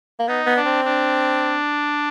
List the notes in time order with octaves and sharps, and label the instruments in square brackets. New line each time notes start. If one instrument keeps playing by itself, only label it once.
[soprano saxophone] A#3
[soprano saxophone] B3 [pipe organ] D#4
[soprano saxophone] B3
[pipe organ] D4
[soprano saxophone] C4
[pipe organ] D4